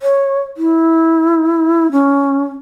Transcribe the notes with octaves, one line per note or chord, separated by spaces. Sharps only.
C#5
E4
C#4